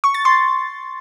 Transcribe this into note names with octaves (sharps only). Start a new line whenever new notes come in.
C#6
A6
C6